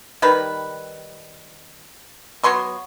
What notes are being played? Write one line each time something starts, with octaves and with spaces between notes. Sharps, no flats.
D#3 G3 B4
F#3 B3 C6 C#6